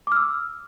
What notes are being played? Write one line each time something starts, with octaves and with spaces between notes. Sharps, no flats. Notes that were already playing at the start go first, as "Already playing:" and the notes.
D6 E6 F6